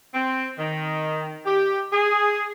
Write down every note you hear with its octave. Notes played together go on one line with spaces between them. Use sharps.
C4
D#3
G4
G#4